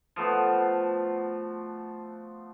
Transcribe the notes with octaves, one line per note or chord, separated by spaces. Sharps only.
F3 A3 B3 F#4